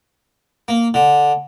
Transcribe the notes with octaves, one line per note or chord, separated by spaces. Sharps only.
A#3
D3